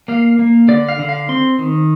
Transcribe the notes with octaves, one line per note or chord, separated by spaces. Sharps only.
A#3 F5
A#3
D3 D5
F5
D3
F5
C4 C6
D#3